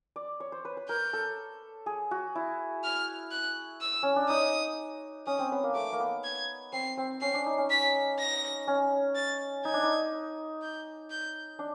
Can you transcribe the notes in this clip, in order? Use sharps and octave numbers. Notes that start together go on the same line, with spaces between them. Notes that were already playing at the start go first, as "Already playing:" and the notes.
D5
C#5
C5
B4
B4
A#4 G6
A4
G#4
F#4
E4
F6
F#6
E6
C#4
D4
D#4 D#6
C#4 D#6
C4
B3
A#3
A3 D6
A#3
B3
G#6
C4 C7
C4
C#4 C7
D4
D#4
C#4
B6
A#6
C#4
A6
D#4 G#6
D4
D#4
G6
G6
D4